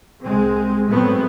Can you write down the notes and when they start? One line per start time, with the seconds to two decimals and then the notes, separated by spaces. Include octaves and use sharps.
0.23 C2 G#3 C4
0.90 G#2 F#3 A3 B3 C4